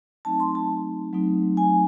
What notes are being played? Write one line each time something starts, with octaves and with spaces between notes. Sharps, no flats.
F#3 A3 C4 D#4 A5
C6
A5
F#3 A3 C4 D#4
G#5